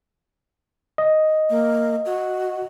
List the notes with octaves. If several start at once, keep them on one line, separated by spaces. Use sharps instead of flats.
D#5
A#3
F#4